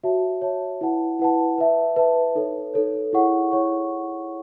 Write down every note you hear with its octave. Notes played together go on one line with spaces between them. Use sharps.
F#4 C#5 E5 A5
F#4 C#5 E5 A5
E4 B4 F#5 A5
E4 B4 F#5 A5
B4 E5 A5
B4 E5 A5
D#4 A4 C#5
D#4 A4 C#5
E4 G#4 C#5 F#5 C#6
E4 G#4 C#5 F#5 C#6